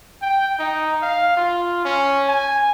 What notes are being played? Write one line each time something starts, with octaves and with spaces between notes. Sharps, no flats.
G5
D#4
F5
F4
C#4
G#5